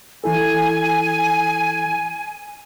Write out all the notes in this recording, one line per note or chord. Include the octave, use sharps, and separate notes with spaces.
E3 E4 A4 G#5